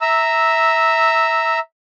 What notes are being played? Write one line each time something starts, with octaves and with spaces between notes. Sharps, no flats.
E5 A#5 E6